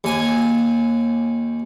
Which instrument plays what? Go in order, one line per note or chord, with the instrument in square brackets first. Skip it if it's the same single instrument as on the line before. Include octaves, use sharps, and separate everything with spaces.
[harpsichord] D#2 G#5